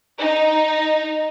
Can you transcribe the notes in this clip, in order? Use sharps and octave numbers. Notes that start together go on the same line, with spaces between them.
D#4